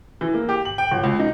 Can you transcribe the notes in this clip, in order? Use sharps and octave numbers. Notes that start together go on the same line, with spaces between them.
E3
A#3
G4
F#7
G5
G1
C#2
D#4